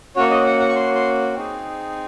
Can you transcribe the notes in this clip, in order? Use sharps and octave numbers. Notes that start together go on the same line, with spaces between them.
A#3 C#4 F#4 C#5
D#5
F#5
F#5
C#6
C6
C6
C4 D#4 G#4